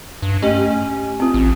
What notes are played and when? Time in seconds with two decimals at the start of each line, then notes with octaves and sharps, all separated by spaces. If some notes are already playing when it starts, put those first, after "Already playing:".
0.22 G2
0.42 A3 C#4 G4 D#5
1.20 C4 F4
1.34 A1